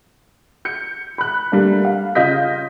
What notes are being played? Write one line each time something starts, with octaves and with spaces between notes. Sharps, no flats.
G6 C#7
B5 F#6
G3 A3 A#3 D4
F5
C#3 F4 D#5 G6 B6